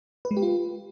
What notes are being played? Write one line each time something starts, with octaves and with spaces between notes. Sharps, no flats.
B4
G#3
G4
F4